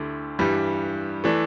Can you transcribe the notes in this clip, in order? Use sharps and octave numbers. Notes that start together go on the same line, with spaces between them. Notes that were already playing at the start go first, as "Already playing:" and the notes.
Already playing: D2 D3 A3 E4 G4
G2 E3 G3
E3 A3 D4